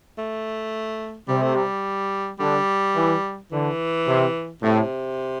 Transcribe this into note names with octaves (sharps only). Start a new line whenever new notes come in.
A3
C3 G3
A3
G3
D3 G3
E3
D3 E3
C3
A2 C3